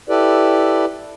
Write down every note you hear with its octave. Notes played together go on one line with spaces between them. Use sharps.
E4 G4 A4 B4 D5